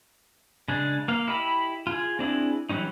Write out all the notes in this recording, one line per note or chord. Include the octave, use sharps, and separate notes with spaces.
C#3 G#3 D4
A#3 F5
E4 G4 D#5 B5
F4 G#4
C4 D4 E4 G#4
E3 F#3 G3 C#4 D#4